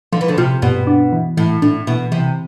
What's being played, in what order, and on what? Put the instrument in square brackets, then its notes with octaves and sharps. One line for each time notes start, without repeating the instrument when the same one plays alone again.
[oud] D3 [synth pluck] F3
[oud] E3
D2 D3
[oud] C3 [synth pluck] F4
[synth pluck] G2 [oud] B2
[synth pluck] D4
E3
[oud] A2 [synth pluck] E3
[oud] A2 [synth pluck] D4
[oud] B2 [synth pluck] E3
[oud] C3 [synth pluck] E3